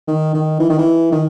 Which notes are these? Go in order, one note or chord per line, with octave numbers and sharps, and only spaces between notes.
D#3
D#3
E3
D#3
E3
D#3